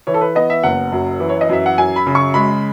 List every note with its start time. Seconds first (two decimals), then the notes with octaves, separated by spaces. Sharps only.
0.07 E3 C#5
0.14 A4
0.21 B4
0.35 B3 D#5
0.50 E5
0.63 F#1 F#5
0.92 F#2
1.20 E3
1.29 C#5
1.41 D#5
1.49 F#2 E5
1.66 F#5
1.78 F#2 G#5
1.96 B5
2.06 C#3
2.15 C#6
2.34 G#3 B5